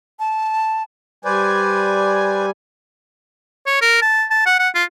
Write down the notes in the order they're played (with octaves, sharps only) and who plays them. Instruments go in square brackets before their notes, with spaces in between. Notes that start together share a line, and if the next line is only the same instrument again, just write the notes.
[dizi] A5
[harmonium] G3 G#5 [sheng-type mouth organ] B4 C5 D5
[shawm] C#5
A#4
A5
A5
F#5
F#5
F4